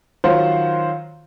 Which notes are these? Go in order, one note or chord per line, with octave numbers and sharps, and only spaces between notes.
D#3 F#3 F4 C5 F#5